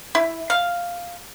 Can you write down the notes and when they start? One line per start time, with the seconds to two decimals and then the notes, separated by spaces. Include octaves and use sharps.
0.15 E4
0.50 F5